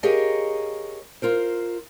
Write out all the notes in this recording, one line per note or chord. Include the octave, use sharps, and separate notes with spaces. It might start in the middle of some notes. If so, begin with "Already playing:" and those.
G4 G#4 A#4 C#5 D#5 F5
F4 A#4 C5